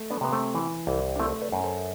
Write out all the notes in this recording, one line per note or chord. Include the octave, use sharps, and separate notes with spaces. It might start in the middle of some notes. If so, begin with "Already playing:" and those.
Already playing: A3
B3 D4
C3 B3
A3 C4
E3
C2
D4
A3 C4 E4
B4 D5
F#2
A4 C5